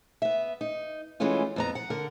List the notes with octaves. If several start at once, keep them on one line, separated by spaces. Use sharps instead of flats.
B3 E5
D#4
E3 G#3 A3 C#4 F4
F2 B3 A#5
F#5
D3 A#4 F#5